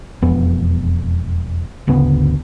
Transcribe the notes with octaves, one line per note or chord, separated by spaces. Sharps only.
E1 F2 B3
G1 D2 C#3 B3